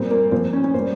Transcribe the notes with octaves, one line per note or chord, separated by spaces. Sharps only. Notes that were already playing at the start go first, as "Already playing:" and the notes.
Already playing: A#2 G3 C4
A#3
A#2 F3 C4
C#4
C#4
A#2 G3 C5